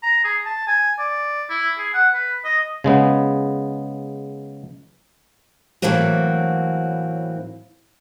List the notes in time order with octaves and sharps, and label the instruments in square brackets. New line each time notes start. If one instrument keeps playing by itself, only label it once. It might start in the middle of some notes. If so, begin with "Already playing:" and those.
[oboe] A#5
G#4
A5
G#5
D5
E4
G#4
F#5
B4
D#5
[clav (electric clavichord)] C#3 G#3 B3
[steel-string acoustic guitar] A2 E3 F#3 A#3 C4 F#4